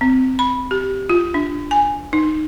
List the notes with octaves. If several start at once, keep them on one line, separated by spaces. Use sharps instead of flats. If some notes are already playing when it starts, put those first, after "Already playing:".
C4
B5
G4
F4
D4
G#5
D#4